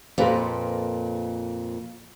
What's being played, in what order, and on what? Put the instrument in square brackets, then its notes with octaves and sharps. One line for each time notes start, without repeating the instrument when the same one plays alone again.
[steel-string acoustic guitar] F2 A#2 [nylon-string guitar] A4 B4 C5